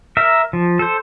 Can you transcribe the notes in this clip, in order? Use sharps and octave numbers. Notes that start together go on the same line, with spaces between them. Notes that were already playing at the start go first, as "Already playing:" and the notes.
A#4 E5
F3
A4 C5